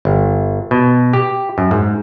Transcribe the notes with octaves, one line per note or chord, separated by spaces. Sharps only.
G1
B2
G4
F#2
G#2